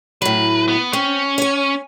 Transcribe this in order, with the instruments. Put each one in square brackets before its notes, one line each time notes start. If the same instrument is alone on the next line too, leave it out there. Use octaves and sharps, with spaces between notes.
[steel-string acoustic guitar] A2 F#3 [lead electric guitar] B4
[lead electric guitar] B3
[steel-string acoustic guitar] C4 [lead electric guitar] C#4
[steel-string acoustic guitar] C#5 G#5